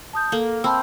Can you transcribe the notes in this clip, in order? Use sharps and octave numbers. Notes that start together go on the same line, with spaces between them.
A5 D#6 G6
A#3 A4
C4 A5 B5 E6